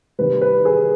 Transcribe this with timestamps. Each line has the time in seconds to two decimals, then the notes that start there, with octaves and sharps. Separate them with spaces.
0.19 C3 D#3 G3 B4
0.42 B4
0.65 G#4